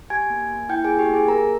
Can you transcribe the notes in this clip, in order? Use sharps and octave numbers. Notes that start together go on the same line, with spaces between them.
G4 G#5 G#6
A#3
A#3
E4 G5 G6
A#3 G#4 G#5
G4 G5
A#3 G#4 G#5
A#3 A#4 A#5